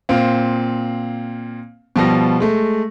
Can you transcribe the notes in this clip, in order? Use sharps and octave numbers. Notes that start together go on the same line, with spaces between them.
A#2 C4 F5
B2 F3 G3 A#6
G#3 A3